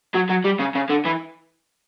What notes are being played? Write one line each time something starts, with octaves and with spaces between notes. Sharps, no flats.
F#3
F#3
G3
C#3
C#3
D3
E3